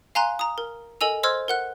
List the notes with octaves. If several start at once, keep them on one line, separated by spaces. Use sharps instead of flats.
F5 G#5 A#5 C6 F#6
A#5 D#6
A#4
A4 A#4 D#5 G#5 E6 F7
C5 D#5 C6 E6 F6 G#6
A#4 F#5 F#6